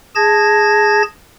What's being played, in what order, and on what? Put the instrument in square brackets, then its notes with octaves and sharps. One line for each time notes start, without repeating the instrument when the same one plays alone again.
[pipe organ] G#4 A5 G#6 A#6